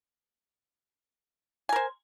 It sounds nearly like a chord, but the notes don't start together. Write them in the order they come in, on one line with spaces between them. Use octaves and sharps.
G#5 A#4 C5